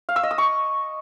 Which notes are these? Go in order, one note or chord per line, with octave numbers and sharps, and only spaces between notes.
F5
E6
D#5
D#6
C#6